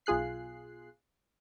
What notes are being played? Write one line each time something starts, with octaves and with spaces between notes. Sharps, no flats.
B1 F4 G#4 F#6 C7